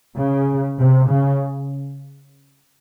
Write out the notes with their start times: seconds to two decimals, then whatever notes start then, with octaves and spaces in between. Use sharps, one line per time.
0.18 C#3
0.79 C3
1.09 C#3